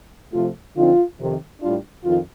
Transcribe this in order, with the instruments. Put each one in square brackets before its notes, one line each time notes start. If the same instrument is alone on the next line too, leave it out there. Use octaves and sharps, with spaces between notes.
[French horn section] C3 F3 A3 F4
D3 F3 C4 D#4 F4
F2 C3 D#3
A2 G3 D4 F4
F2 D#3 F4